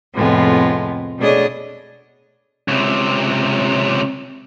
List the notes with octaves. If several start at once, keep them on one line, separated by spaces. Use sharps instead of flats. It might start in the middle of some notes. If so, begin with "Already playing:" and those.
F2 A2 C3 F3 G#3 B3
B2 A3 D4 G#4 C#5 D#5
C#2 C3